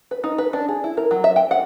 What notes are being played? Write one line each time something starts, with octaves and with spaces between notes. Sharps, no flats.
B4
D#4
B4
D4
G#4
E4
A#4
F#3
E5
G5
F#5